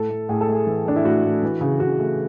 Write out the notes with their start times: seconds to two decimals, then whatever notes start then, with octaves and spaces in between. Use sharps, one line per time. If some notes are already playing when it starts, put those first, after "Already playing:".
Already playing: A2 A4
0.09 A3
0.29 A2 G#4
0.41 A4
0.48 A3 G#4
0.67 E3
0.85 A3 D4
0.96 E4
1.05 A2 F#4
1.24 A2
1.43 E3
1.61 C#3
1.80 C#3 F#4
1.99 A3